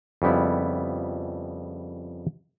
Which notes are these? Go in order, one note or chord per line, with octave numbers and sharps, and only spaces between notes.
F2 C#3 G3 B3 E4